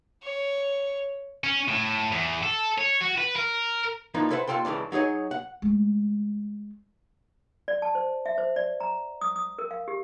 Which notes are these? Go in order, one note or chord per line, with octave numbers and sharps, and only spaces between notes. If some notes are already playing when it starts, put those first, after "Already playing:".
C#5
C#4
A2
E2
A4
C#5
F#4
B4
A#4
E3 F3 A#3 D4 D#4
E4 A4 B4 C5 F#5
D#2 D#3 F4 A4 G5 C6
C#2 C#3 E3 D4
F#3 D#4 G#4 C#5 D#5
F#5
G#3 A3
D5
A5
C5
E5
C5
D5
A#5
D#6
D#6
A#4
F5
G4